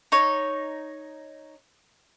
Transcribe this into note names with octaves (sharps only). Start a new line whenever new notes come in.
D#4 C#5